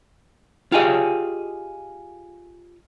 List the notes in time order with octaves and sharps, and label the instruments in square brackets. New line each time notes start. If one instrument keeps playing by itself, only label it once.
[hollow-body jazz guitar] F4 G4 G#4 D#5